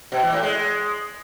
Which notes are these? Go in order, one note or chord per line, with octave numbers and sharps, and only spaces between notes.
B2
E3
A2
G#3